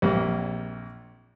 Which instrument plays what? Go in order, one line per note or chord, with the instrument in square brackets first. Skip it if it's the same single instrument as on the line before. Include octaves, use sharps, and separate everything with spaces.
[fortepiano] A#1 F2 G3 A#3